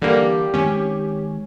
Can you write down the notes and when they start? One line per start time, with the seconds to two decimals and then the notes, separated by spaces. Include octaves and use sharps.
0.02 D3 E3 G3 A#3 G4
0.54 D#3 G#3 C4 C#4